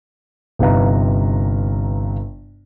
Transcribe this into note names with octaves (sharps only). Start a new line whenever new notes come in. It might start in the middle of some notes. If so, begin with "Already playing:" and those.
G1 C3 D#4 B4 F5 A#5